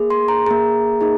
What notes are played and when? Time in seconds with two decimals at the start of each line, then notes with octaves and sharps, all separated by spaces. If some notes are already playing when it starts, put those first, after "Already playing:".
Already playing: A#3 G#4
0.10 C6
0.28 A#5
0.46 A#3 G#4 A#5
1.01 A#3 D#4 G#4